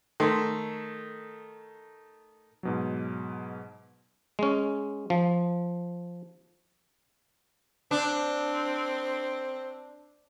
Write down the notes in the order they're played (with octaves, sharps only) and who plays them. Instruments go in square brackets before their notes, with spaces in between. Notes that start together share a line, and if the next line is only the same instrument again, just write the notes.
[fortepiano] D#3 A3 C6
[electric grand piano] G#2 B2 F#3
[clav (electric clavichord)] G#3 C#4
F3
[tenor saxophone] C4 [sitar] D4